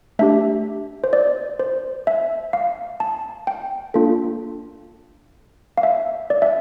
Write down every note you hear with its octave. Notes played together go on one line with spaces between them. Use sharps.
A3 D4 G4 E5
C5
D5
C5
E5
F5
A5
G5
A#3 D4 F4 A4
F5
E5
D5
E5